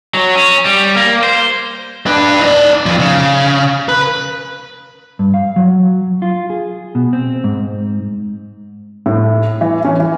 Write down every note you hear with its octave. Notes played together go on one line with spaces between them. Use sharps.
F#3
C#4
G3
A#3
C5
D4 B4
D#4 D5
F2 F3
C#3
B4
G2
F5
F#3
F4
G#4
B2
C4
G#2
A2
E3
C#4
E3